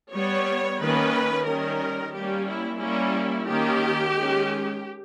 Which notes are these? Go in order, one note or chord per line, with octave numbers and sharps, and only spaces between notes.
G3 B3 C#5
D#3 A#3 C#4 B4
D#3 G3 C#4 A#4
G3 A#3 C#4 G4
E4
G3 A#3 C#4 E4
D#3 A#3 C#4 G4
D#3 G#3 C#4